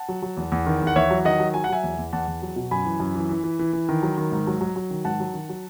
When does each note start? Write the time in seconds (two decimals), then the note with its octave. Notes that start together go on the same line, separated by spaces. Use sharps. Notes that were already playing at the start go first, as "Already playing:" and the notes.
Already playing: F#5 A5
0.09 F#3
0.22 F#3
0.37 E2
0.52 E2
0.66 D#3
0.82 E2
0.87 F#5
0.96 E2 C#5 E5
1.11 F#3
1.25 D#3 D#5 F#5
1.40 F#3
1.54 F#3 G#5
1.64 F#5
1.69 F#3 E5 G#5
1.84 E2
1.98 E2
2.13 E2 F#5 A5
2.28 E2
2.42 F#3
2.56 B2
2.71 F#2 G#5 B5
2.85 E3
3.00 F#2
3.16 E3
3.29 E3
3.44 E3
3.59 E3
3.73 E3
3.89 D#3
4.03 F#3
4.18 D#3
4.32 G#2
4.47 F#3
4.61 F#3
4.76 F#3
4.90 D#3
5.05 G#2 F#5 A5
5.20 F#3
5.34 D#3
5.49 F#3